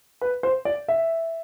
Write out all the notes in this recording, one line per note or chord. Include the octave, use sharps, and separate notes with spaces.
B4
C5
D5
E5